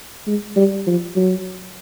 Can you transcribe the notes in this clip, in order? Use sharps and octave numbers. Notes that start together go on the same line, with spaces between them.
G#3
G3
F3
F#3